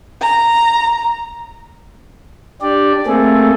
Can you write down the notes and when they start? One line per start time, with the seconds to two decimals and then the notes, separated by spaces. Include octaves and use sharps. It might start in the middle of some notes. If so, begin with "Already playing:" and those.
0.21 A#5
2.62 D4 G4 D5
3.06 A3 A#3 C4 G#4 A4